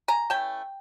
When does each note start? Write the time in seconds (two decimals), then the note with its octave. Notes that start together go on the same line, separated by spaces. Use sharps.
0.08 G#5 A#5
0.30 E3 A3 C#4 G5 A5